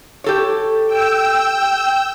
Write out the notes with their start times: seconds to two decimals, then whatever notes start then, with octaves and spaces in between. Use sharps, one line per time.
0.24 G4 A4 C#5
0.86 G5 E6